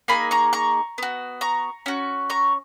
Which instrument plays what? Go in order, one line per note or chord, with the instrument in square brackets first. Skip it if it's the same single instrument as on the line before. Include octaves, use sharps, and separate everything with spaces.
[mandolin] A#3 D#4 G#4 G#5 B5
A#5 C#6
A#5 C#6
B3 F#4
A#5 C#6
C#4 F#4
A#5 C#6